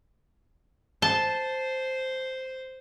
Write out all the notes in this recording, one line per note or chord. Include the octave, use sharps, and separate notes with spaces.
C5 A5